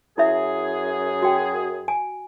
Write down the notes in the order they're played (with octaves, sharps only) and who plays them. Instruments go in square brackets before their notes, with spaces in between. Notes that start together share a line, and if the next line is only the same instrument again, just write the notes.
[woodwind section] F#2 G#4 [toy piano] E4 E5
[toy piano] F#4 G5
G#5